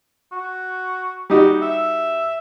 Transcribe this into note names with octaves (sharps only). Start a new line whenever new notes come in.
F#4
G3 D#4 F#4 G4
E5